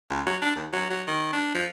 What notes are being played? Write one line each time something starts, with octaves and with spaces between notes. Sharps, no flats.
C#2
F#3
D4
D#2
F#3
F#3
D#3
D4
F3